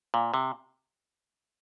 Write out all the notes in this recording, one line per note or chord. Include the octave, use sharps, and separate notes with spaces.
A#2
C3